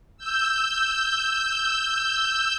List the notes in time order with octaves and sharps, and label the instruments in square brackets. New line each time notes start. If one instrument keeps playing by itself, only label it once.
[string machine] E6 G6